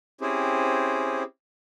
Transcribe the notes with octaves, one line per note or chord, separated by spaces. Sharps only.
C4 C#4 E4 G4 G#4 C5